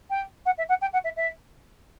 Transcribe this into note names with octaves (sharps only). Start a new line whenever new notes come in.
G5
F#5
E5
F#5
G5
F#5
E5
E5